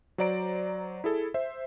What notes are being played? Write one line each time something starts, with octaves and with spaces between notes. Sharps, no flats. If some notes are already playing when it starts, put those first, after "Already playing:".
F#3 C5 D5 A#5 D7
E4 G#4 A4
C5 E5